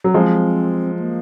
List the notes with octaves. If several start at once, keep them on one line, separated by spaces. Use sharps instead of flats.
F#3
F3 G#3 C4
A#3